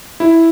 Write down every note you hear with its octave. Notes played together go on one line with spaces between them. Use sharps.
E4